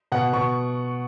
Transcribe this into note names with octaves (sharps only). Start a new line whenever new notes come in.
B2 F#5
B2 C#6